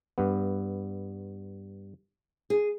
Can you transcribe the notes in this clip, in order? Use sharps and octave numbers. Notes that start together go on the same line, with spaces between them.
G2 B3
G#4